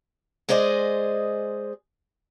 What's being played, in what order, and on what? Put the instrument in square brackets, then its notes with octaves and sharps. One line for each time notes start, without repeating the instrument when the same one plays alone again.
[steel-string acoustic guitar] G#3 G#4 C5 D5 D#5